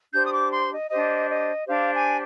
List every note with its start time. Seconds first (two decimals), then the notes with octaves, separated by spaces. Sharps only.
0.12 D4 G4 C5 G6
0.26 D#6
0.33 D6
0.51 C6
0.70 D#5
0.90 D4 G4 C5 D#5
1.28 D#5
1.67 D4 G4 C5 F5
1.93 G#5